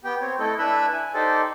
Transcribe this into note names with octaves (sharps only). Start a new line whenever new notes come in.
B3 G4 G5
C4 C#5
A3 E4 A4 D#5
D4 E4 B4 E5 B5 E6
G#5
D#4 G4 A4 C5 D5